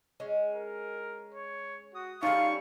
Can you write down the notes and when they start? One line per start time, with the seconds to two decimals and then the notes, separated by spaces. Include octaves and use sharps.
0.20 G#3 C#4
0.54 A#4
1.35 C#5
1.94 F#4 D#6
2.23 G3 A3 C#4 D#4 F5 C#6